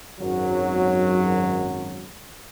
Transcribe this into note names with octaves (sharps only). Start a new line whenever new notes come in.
G#1 F#2 F#3